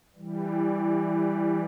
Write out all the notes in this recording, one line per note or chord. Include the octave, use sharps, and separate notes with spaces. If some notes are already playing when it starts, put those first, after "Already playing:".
E3 G3